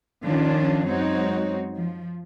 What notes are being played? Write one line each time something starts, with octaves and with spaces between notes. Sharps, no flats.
D#3 F3 C#4 D4 F4
F#2 G#3 C4 D#4 F#4 C#5
F3